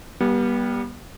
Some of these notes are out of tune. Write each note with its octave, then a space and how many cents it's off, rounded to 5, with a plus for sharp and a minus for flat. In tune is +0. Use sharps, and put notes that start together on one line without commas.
G3 +0 B3 -35